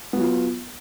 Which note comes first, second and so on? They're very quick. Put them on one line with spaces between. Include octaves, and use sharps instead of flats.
B3 F#3 F4